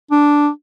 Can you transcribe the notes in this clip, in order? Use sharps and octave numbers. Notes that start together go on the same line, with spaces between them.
D4